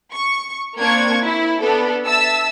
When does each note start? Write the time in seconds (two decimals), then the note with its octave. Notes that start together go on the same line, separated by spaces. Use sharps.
0.13 C#6
0.78 A#3 C4 D4 C#6 G#6
1.22 E4
1.61 B3 D4 A4
2.07 E5 A5 E6